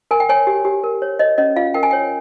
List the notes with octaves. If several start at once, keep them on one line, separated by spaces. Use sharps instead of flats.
A#4 G#5
G5
C#5 G#5
G4
G4
A#4
C#5
C#5 D#5
C#4 D#5
F4 F5
A#4 G5
G#5
C#5 G5